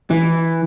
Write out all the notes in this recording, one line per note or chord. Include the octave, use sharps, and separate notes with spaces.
E3